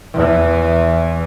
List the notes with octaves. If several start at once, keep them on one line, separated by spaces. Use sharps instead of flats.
E2 E3